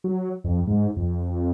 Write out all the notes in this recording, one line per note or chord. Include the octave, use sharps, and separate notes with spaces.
F#3
F2
G#2
F2